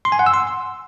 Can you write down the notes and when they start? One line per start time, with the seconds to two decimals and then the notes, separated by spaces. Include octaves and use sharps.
0.05 C6
0.12 G#5
0.19 F#5
0.26 E6
0.34 C6